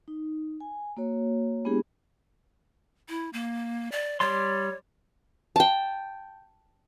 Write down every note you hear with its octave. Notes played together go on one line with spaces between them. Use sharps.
D#4
G#5
A#3 F#4 C#5
G#3 B3 D4 E4 G4 G#4
E4
A#3
D5
G3 C#5 D5 C6
G5 A5